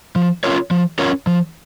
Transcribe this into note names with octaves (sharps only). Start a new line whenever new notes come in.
F3
C#4 F4 A#4 C#5
F3
C#4 F4 A#4 C#5
F3